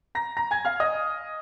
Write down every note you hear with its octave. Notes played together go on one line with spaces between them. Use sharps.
A#5 A#6
A#5 A#6
G#5 G#6
F5 F6
D#5 D#6